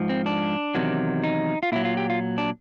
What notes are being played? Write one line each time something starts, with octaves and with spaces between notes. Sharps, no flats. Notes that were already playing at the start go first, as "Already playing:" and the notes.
Already playing: G#2 F3
C4
D4
E2 C3 D#3 F#3
D#4
F4
A#2 F#3 E4
F4
G4
F4
D4